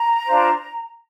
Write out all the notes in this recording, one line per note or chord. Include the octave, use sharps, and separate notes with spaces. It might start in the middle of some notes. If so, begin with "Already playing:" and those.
Already playing: A#5
D4 F4 C5